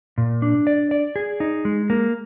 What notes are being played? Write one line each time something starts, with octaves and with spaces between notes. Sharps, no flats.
A#2
D4
D5
D5
G#4
D#4
G#3
A#3